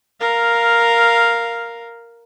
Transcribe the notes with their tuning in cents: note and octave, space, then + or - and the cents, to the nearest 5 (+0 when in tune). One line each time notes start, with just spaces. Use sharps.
A#4 +0 F5 +0